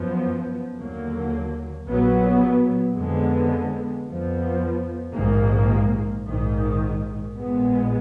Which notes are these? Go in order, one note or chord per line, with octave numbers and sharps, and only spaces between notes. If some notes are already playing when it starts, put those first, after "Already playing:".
Already playing: F#2 F3 B3
D#2 D3 F#3 A#3
A#1 A#2 F#3 B3
F2 D3 G#3 B3
F2 F3 B3
A#1 G#2 D#3 A#3
A#1 G#2 D#3
A#1 A#2 G#3 B3